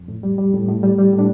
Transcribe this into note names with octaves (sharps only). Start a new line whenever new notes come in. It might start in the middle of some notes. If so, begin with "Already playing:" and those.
Already playing: F2
A2
G3
G3
A2
A2
G3
G3
A2
D4